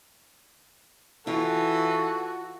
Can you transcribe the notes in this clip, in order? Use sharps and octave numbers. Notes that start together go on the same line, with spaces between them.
E3 F4 F#4 A4